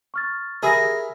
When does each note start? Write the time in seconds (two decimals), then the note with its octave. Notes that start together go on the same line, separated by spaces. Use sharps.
0.14 C#6 F6 A6
0.63 G4 G#4 A#4 E5 B5 A#6